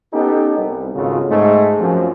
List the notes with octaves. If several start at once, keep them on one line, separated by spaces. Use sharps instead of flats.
B3 C#4 D#4 G4 A4
C2
G#1 C#2 C#3 F4 F#4 A4
G#2 G#3 A3
F#2 F3 C4